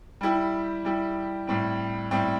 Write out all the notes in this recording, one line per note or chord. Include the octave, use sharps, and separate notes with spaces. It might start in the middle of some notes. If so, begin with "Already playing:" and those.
G3 E4 G4
G3 E4 G4
A2 G3 C4
A2 G3 C4